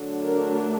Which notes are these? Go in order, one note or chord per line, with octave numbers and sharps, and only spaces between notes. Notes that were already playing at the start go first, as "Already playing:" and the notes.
Already playing: D3 F#3 A3 D4
A#4